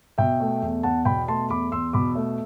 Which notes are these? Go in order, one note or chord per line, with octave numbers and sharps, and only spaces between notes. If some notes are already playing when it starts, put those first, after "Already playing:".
B2 E5 G5
A3
E2
E2 F#5 A5
B2 G5 B5
A3 A5 C6
E2 B5 D6
E2 C6 E6
B2 B5 D6
A3